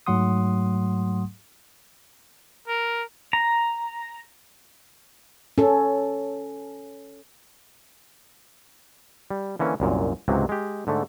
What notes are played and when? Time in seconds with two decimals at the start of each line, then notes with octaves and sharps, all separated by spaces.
0.06 G#2 F#3 A3 F#5 C6 D#6
2.68 A#4
3.33 A#5
5.58 C#4 A4
9.30 G3
9.59 D3 E3 A#3 C#4
9.80 C2 F#2 A#2
10.28 C#2 G#2 C3 F#3
10.49 G#3 G4
10.87 G#2 D3 A3